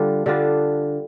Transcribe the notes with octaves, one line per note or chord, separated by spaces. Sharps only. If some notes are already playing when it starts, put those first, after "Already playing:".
Already playing: D3 G3 D4 F4
D3 G3 D4 F4